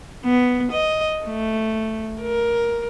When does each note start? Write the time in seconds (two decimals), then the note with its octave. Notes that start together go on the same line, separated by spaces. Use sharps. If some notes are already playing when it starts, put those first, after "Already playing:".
0.24 B3
0.72 D#5
1.25 A3
2.21 A#4